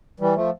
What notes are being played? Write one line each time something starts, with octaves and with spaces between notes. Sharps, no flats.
E3 G3
F3 A3